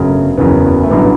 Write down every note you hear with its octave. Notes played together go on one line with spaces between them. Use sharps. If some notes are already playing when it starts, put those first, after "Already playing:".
Already playing: G1 F#2 C#3 F#3 A3
F#1 E2 C#3 F#3 B3
A3
A1 G2 D3 F#3 B3